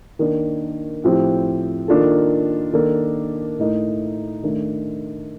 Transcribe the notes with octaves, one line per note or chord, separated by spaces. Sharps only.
D#3 A#3 D4
A2 F3 C4 G4
D#3 A#3 D4 F4 A4
D#3 A#3 D4 A4
A2 A3 D#4 A#4
D#3 A3 D4